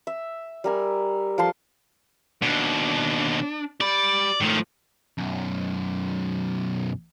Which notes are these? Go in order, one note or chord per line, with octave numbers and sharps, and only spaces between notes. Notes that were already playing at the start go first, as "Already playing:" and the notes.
E5
G3 A#4 G#5
F3 A4 A5 C6
D#2 B2 D4
G4 D5 B5
G#2 D#3 F3 A3
B1 F#2